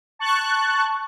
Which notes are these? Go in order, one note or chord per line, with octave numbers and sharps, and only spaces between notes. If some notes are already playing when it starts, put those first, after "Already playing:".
A5 C#6 F#6